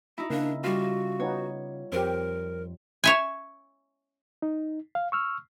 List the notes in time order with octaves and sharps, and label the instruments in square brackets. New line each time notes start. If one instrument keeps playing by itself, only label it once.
[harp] D#4 E4 [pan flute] F#4
[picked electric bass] C#3 [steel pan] A#3 [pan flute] D4
[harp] G3 F4 [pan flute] F#4
[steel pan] B3 D#4 [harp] C#5
[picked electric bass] F2 [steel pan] C4 G4 [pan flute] A#4
[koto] C#5 E5 G#5
[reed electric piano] D#4
F5
C#6 E6 F6